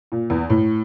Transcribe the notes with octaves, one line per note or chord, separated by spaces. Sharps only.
A#2
E2
A2